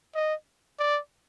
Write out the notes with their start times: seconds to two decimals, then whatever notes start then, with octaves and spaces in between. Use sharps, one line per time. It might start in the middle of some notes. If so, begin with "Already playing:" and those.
0.15 D#5
0.79 D5